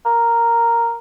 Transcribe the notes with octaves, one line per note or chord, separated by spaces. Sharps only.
A#4